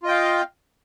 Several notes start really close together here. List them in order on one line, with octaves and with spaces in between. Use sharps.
F4 D#5 G5 F5